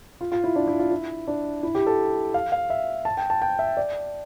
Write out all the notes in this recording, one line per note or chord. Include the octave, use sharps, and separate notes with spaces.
F4
F4
E4
D4
E4
F4
E4
D4
E4
G4
A4
F5
F5
E5
A5
G5
A5
G5
E5
D5